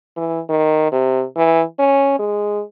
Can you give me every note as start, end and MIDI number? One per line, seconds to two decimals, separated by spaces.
0.17 0.40 52
0.49 0.90 51
0.92 1.24 48
1.37 1.63 52
1.79 2.14 61
2.19 2.62 56